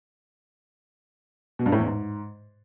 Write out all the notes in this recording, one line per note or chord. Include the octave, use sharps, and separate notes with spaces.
B2
G2
A2
E2
G#2